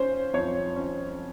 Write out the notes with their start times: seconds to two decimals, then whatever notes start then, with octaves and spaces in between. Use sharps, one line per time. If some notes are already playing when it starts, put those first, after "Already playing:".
Already playing: C#4 C5
0.34 F2 C#5
0.76 C#4